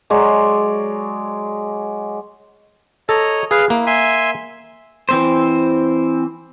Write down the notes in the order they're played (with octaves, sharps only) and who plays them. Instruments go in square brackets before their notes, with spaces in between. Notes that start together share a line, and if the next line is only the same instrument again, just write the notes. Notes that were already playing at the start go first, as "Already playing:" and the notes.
[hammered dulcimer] F#3 G#3 C#5 D5
[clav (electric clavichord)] A4 [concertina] C#5 D#5 A#5
[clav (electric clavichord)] G#4 [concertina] B4 F5
[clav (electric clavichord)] A#3 [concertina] E4
[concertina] E5 G#5 C6
[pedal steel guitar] E3 C4 C5